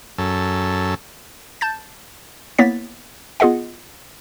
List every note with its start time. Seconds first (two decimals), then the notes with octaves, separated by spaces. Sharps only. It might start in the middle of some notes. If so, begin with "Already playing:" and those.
0.18 F#2 A4
1.61 A5 G6 A6
2.58 A#3 B3 E4 C#5 A6 B6
3.40 B3 F4 G#4 D#5 F#5